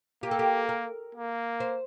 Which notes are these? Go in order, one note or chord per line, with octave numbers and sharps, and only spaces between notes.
A#3 G4
A4
G4
A#4
A#3
C5